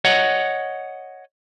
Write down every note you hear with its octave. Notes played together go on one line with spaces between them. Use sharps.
C#5 D#5 F#5